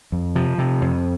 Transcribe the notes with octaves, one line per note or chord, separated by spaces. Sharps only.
F2
C3 F3
C3
F2